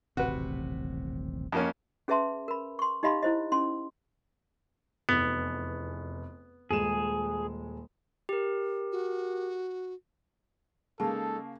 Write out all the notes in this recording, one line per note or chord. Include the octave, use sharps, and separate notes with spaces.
D#1 A1 C3 F#4 B4
F2 A#3 C#4
C#4 G#4 B4 E5 A5 C6
A#4 B5
C6 C#6
D#4 G4 D#5 F5 B5 C6
E4 C5 D#5
C#4 C6
F1 E2 B3
D#1 G#3 G#4 E7
G4 A#4
F#4
C#3 G#3 A#3 D#4 A4 A5